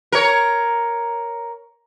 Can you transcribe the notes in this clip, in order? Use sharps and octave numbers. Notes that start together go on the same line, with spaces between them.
A#4 C#5